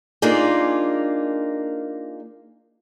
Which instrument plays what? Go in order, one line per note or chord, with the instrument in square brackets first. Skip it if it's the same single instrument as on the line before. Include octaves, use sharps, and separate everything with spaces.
[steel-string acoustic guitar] A#3 D4 D#4 F4 G#4 A#4